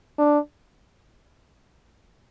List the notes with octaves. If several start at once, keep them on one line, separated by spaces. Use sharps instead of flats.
D4